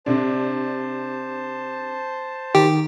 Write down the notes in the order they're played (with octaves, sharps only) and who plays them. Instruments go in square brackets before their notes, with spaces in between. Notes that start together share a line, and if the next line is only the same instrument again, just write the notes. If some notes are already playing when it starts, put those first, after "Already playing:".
[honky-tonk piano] C3 D4 [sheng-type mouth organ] C5 A5
[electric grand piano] D#3 [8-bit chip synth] G4